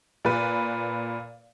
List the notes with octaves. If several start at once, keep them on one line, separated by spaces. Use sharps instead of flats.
A#2 B4